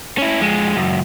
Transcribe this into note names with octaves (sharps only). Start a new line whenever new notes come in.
C#4 E4
F2 G#3
C#2 F#2